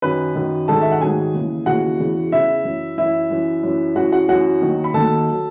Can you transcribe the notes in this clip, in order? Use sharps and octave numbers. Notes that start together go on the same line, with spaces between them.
F#2 D#3 F#3 B4 B5
F#2 D#3 F#3
G#2 D#3 F#3 A4 A5
E5
F#5
G#2 D#3 F#3 G#4 G#5
D#2 C#3 E3
D#2 C#3 E3 F#4 F#5
E2 C#3 E3
E2 C#3 E3 E4 E5
F#2 E3
F#2 E3 E4 E5
F#2 E3
F#2 E3
F#2 E3 F#4 F#5
F#4 F#5
F#2 E3 F#4 F#5
D#2 D#3 F#3
B5
D#2 D#3 F#3 A4 A5
F#3